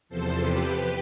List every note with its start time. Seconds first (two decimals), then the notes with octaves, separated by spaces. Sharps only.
0.09 E2 C3 F3 A4 C5
0.39 G4 B4